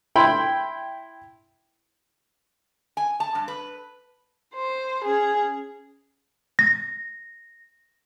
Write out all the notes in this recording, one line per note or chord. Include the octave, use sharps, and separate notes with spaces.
E4 G5 B5 C6
G#5
A5
G2
B4
C5
C#4 G#4
A#6